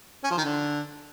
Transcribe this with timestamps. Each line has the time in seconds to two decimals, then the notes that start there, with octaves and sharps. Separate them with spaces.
0.24 C#4
0.31 F3
0.38 D#3
0.44 D3